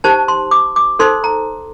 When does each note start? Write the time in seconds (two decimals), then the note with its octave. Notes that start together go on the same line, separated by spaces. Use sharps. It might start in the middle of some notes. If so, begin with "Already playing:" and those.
0.04 D#4 G4 C5 A5
0.28 C6
0.51 D6
0.76 D6
0.99 D#4 A4 C5 C6
1.24 A#5